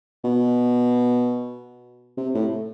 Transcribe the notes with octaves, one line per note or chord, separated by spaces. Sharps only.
B2
C3
A2